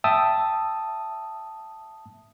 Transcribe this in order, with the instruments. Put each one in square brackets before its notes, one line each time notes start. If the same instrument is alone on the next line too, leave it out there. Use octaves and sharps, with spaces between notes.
[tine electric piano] E5 G5 A5 D#6 E6